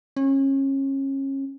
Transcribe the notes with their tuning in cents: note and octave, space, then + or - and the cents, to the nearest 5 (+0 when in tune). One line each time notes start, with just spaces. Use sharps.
C#4 -30